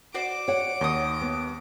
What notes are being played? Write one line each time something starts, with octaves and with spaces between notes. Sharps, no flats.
F#4 C5 D5 D6
C#5 F#5
D#2 D#4 D#6
B3